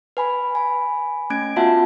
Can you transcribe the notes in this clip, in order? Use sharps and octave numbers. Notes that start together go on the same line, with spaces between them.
B4 G#5 B5
G#5 B5
A3 C#4 G#6 D7
B3 F4 F#4 E5 F#5 A5